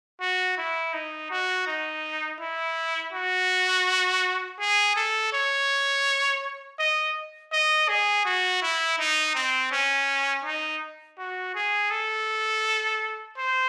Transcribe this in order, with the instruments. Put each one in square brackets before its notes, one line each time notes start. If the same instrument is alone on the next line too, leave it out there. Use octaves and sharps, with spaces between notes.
[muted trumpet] F#4
E4
D#4
F#4
D#4
E4
F#4
G#4
A4
C#5
D#5
D#5
G#4
F#4
E4
D#4
C4
C#4
D#4
F#4
G#4
A4
C5